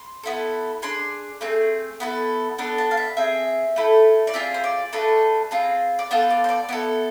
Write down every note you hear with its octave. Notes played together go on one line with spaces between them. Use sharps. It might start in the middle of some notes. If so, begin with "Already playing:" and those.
Already playing: C6
B3 E4 A4
D4 G#4 C6
A3 C4 G#4
B3 E4 A4
B3 D4 A4
A5
F5
E5
C4 G#4 E5
A3 E4 A4
D5
C4 F4 G#4 E5
C5
D5
A3 D4 A4 B4
C4 F4 G#4
D5
B3 F4 A4 C5
D5
C5
D5
B3 E4 A4 D5